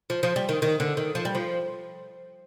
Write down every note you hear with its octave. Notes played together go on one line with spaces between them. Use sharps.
F3
F3
G3
D#3
D#3
D3
D#3
F3
G3
F3